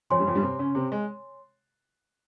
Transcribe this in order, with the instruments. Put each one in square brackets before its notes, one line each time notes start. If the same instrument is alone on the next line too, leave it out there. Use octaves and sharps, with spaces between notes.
[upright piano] F2 F3 [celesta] C#5 G#5 C6
[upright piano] G2 G3
F2 F3
G2 G3
C3 C4
C#3 C#4
C3 C4
G#3